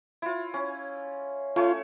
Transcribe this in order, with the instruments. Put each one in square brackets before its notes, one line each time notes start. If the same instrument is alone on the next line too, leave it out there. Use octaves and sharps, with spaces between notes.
[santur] E4 F4
C#4
[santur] A3 C#4 C#5 [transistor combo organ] F4